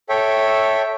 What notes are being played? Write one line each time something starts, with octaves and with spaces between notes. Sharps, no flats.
A4 C#5 E5 G5